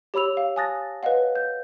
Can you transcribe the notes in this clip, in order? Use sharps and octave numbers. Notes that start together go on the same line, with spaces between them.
G4 C#5 B5 E6 F7
F5
G#5 A5 D#6 F#6 A6 A#6
B4 C#5 D#5 F5 F#5
G6